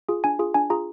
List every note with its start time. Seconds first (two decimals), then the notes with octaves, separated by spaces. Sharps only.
0.09 F4 G#4
0.24 D4 G#5
0.39 F4 G#4
0.54 D4 G#5
0.70 F4 G#4 A#5